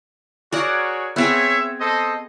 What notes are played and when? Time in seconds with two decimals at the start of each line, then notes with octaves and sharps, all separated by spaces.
0.52 F#4 G#4 A#4 C#5 D5 F#5
1.16 B3 C4 G#4 C#5 E5
1.80 A4 C5 D#5